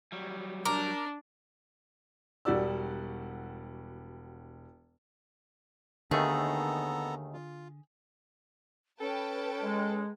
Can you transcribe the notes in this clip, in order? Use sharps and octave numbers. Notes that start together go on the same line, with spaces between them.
F#3 G3
D4 A#4 D6
E1 G3 F#4 G4 D5 E6
D#2 D3 D#3 A3 B3 G#4 A4 A#5
F4
C#4 A4 B4 G5 A5
G#3